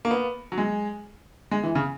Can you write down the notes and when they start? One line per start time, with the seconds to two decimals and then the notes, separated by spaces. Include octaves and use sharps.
0.05 A#3
0.11 B3
0.52 F#3
0.58 G#3
1.51 G#3
1.63 E3
1.75 C#3